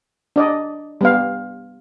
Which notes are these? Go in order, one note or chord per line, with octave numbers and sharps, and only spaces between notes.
D4 D5 D#5
G3 B3 F5